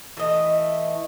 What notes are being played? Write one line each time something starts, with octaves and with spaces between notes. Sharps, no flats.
E3 A3 D#5